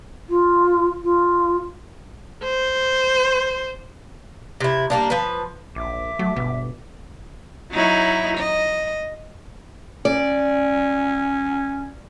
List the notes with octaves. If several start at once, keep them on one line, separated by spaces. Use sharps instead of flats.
F4
F4
C5
C3 E4
G3 A#3 D4
F3 B4
A#1 E5 D6
F#3 A3
G1 B2
F#3 D#4 E4
D#5
C#4 D5